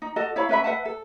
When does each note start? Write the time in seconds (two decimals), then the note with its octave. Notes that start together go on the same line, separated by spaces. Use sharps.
0.02 D#4
0.16 F#4 A4 D#5 A5
0.36 E4 C#5 F5 B5
0.49 C#4 B4 E5 B5
0.64 B4 E5 F#5 A5
0.85 A4